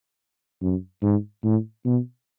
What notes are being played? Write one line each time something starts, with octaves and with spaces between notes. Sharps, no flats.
F#2
G#2
A2
B2